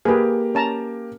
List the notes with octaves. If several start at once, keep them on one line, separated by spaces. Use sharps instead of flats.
A#3 G4 G#4 B4
C#4 A5 A#5